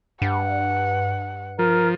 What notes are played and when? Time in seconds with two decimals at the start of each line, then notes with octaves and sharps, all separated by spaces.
0.22 G2 F#5
1.59 F3 A#4